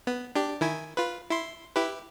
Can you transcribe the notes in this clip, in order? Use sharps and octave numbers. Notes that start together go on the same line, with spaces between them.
B3
D4 G4
D#3 E4 G#5
F4 B4
E4 C6
E4 G4 B4